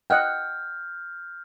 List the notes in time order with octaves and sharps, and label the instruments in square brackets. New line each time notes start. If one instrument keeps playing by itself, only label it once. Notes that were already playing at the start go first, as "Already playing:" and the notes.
[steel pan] D#5 F#5 G5 [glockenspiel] F6 G6